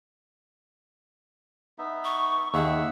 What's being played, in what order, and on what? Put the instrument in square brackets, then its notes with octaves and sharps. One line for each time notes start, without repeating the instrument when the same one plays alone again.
[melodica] B3 D#4 E5
[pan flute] C#6
[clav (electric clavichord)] D#2 [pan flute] G#4 [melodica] E5 F#5 E6